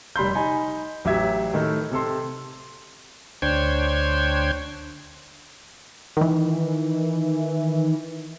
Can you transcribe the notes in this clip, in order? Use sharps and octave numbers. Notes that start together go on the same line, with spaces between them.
F1 G3 B5 C6 G6
D#4 G#5 B5
A1 F#3 G4 E5 G#6
A2 D#3 A3
C3 A4 C6
D2 D4 C5 C#5 G5 G#6
D#3 E3